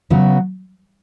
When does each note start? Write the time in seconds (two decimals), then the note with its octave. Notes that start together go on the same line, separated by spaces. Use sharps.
0.10 C#3 F#3 B3 F#4